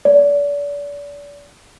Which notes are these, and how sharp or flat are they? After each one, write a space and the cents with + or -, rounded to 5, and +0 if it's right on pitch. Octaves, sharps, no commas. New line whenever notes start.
D5 -35